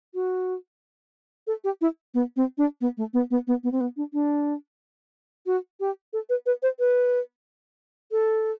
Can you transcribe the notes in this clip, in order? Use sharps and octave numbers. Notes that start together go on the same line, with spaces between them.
F#4
A4
G4
E4
B3
C4
D4
B3
A3
B3
B3
B3
B3
C4
B3
D4
D4
F#4
G4
A4
B4
B4
C5
B4
A4